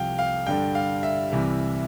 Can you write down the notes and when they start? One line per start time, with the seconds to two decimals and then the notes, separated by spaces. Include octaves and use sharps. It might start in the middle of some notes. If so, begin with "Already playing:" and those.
Already playing: C2 C3 F3 F5 G5
0.18 F5
0.47 G2 D3 G3 G5
0.75 F5
1.03 E5
1.32 C2 C3 E3 G3